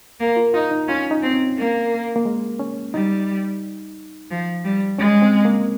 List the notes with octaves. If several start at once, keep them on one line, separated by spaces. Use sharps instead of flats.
A#3
F4
D#4 F4
D#4
C#4 F4
D#4
C4
C#4
A#3
A#3
G#3
C#4
G3 D#4
F3
G3
G#3 C#4
C4
A#3